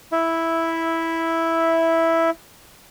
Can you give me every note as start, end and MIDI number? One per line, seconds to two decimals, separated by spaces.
0.12 2.30 64
0.12 2.30 76